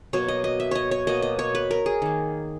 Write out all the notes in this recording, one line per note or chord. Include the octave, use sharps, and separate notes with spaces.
B2 F#3 A#3 C#5
D#5
D#5
E5
C#5 D#5
C#5
B2 A#3 D#5
D#5
C#5
B4
A#4
G#4
D#3 A#3